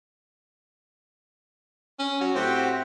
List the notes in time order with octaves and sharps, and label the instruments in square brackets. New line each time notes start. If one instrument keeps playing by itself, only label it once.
[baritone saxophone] C#4
F#3
[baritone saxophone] A2 [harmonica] C4 F#4 G4